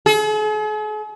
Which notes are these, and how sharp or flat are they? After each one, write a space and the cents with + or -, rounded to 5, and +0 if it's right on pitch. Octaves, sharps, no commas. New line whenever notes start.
G#4 +45